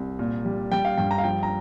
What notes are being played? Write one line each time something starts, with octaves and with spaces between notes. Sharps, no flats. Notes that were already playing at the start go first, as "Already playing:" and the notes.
Already playing: C2
A#2
G3
G3 G5
F5
G2 G5
A#5
F5
F3 G5
A#5